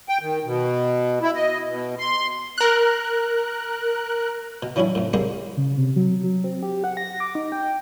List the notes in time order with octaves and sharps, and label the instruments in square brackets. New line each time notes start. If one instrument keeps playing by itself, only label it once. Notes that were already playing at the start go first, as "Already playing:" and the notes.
[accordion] G5
D#3
B2
E4
D#5
B2
C6
[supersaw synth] A#4 F#6
[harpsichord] B2
E3 F#3 C#4 D4 E4
F2 A2
G3 G#3 A#3 C4 G4 G#4
[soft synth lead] C#3
C3
F#3
F#3
C4
G4
F#5
A#6
D6
D#4
G5